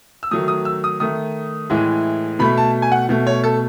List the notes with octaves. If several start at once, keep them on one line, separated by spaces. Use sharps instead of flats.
E6
D#3 F#3 A3 D#6
D#6
E6
D#6
D#3 A3 D#6
A2 E3 G#3
B2 A3 B5
A5
G#5
F#5
B2 A3
C#5
A4